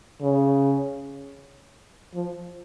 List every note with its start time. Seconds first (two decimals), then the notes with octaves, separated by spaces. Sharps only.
0.22 C#3
2.14 F3